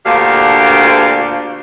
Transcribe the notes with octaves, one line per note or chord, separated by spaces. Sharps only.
D2 A#2 D4 G4 F5